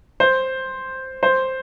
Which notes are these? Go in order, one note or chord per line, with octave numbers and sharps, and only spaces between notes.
C5
C5